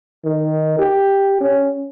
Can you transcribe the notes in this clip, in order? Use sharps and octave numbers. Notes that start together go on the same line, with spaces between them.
D#3
G4
C#4